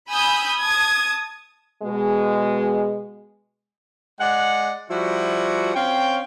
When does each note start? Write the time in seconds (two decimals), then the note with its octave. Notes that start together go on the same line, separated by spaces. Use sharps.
0.10 G#5 B5 D#6 E6 G6
0.60 A5 D#6 G#6
1.83 B2 G#3
4.20 G#3 D5 F#5
4.90 F3 G3 E4 F#4
5.75 C4 C#4 C#5 F5 G5